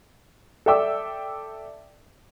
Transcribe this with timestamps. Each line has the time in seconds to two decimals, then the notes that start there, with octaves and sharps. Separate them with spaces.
0.66 A4 D5 E5 G5 D6 E6